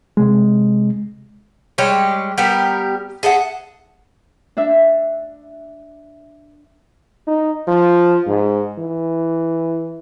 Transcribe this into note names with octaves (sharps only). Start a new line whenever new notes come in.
C3 G#3
G3 G#3 G4 C#5
G3 B3 G4 A#4
G#4 A4 E5 F#5
D4 E5
D#4
F3
G#2
E3